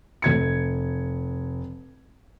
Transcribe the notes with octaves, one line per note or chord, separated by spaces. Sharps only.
F1 G#6 C#7